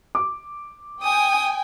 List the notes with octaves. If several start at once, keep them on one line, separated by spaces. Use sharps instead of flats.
D6
G5 G#5 D#6